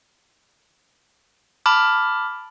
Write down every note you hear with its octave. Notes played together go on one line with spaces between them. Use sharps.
A5 B5 D6 F6